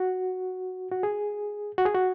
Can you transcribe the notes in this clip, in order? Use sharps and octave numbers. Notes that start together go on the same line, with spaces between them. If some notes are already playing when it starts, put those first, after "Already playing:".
Already playing: F#4
F#4
G#4
F#4
G#4
F#4